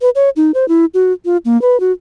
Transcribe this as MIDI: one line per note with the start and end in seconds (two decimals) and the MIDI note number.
0.01 0.10 71
0.15 0.29 73
0.36 0.51 63
0.54 0.67 72
0.68 0.85 64
0.94 1.13 66
1.25 1.37 65
1.45 1.60 58
1.62 1.79 71
1.80 1.92 66